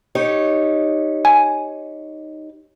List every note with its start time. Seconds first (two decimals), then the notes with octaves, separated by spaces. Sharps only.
0.15 D#4 G4 C#5
1.25 G#5